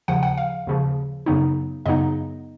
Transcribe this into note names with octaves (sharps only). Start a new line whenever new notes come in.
D#2 C#3 F3 F#5
F#5
F5
D#2 C#3 F3
F#2 C#3 F#3 B3 D#4
F#2 C#3 F#3 B3 D#4 D#5